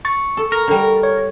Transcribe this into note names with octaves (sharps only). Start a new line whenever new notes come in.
C#6 A6
A4
A#4
D3 G3
C#5